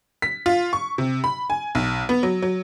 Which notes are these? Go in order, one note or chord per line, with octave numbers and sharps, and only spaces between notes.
B6
F4
C#6
C3
B5
G#5
B1
B3
F#3
F#3